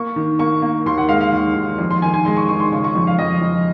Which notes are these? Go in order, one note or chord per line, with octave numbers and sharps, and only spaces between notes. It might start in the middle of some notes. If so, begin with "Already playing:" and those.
Already playing: A#3 C#6
D#3
A#3 C#6
A#3
D#2 C6
F#5
G#3 F5
F5
D#2
D#2
F2
C6
D#3 G#5
G#5
G#3 C6
C#6
D#3 C#6
C6
C#3 C#6
C#6
F2
F5
F2 D#5
F2